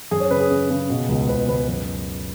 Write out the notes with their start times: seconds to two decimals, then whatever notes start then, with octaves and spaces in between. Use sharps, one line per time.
0.11 F#2 G#4
0.20 C#5
0.31 C#3 B4
0.40 G#4
0.50 C#3
0.70 C#3
0.90 B2
1.09 C#2
1.28 C#2 B4
1.48 C#2 B4
1.68 F#2 B4